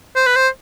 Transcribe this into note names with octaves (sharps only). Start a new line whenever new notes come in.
C5
B4
C5